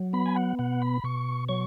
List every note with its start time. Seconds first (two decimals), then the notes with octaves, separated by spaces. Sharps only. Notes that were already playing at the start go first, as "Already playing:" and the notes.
Already playing: F#3
0.13 B3 B5
0.26 G#5
0.36 F#5
0.59 B2 F#5
0.82 B5
1.04 B2 C#6
1.49 F#3 C#6